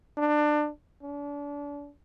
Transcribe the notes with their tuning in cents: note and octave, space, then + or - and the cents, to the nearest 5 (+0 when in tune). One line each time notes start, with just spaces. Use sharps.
D4 +25
D4 -35